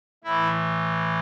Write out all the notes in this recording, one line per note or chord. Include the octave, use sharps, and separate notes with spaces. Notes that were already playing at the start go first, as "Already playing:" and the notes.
A2 E3 E4